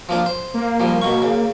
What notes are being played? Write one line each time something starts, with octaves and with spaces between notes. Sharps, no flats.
F3 A#3 D4
C5
A#3
F3 G3
B2 C#6
C#3